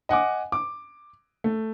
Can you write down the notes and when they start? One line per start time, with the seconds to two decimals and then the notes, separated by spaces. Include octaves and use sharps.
0.09 D#5 F#5 G#5 D6
0.52 D6
1.44 A3